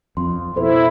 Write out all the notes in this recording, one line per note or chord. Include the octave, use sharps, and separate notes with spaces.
F2 C6
B2 E4 A4 C5